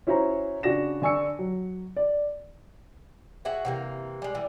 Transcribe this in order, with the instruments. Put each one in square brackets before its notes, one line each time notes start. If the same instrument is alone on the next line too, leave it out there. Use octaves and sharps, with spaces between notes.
[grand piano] C#4 E4 F#4 C5 C#5 A#5
C#3 D4 F#4 D5 A#6 E7
D3 D4 G#5 C#6 E6 C#7
F#3
D5
[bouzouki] F#4 G#4 E5 F#5
C3 E3 A#3
G3 G#3
E3 G3